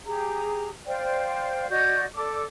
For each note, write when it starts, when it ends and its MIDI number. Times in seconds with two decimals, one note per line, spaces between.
0.05 0.68 67
0.05 0.68 68
0.05 0.68 82
0.86 1.67 72
0.86 1.67 74
0.86 1.67 77
0.86 1.67 79
1.69 2.03 66
1.69 2.03 74
1.69 2.03 75
1.69 2.03 91
2.14 2.42 69
2.14 2.42 74
2.14 2.42 86